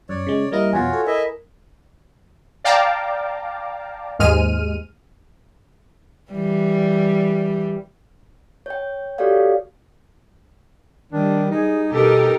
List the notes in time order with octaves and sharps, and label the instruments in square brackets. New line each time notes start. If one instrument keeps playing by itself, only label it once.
[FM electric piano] F#2 [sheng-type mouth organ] C#5 D5
[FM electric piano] C#3 G#3
[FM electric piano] G3 A#3 E4 [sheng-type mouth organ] A#4 D#5
[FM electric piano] F2 B2 [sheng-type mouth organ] F4 F#4 C#5 [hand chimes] G#5
[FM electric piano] A4
[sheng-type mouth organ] E4 D#5 E5 [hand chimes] A#4
[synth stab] D5 F5 G5 A5 A#5 D6
D#2 G#2 G#3 F6 D#7
[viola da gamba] E3 G3
[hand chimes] C#5 G5
F#4 G4 A4 C#5 D5 F5
[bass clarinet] D#3 [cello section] G3 [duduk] D4
[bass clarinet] D#4 [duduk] G#4
[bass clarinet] B2 [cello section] D#4 G4 A#4 [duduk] A4